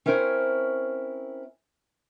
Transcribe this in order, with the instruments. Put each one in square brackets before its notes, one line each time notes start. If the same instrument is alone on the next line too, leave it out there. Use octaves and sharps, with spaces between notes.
[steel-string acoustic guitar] C4 C#4 E4 A#4 C5 C#5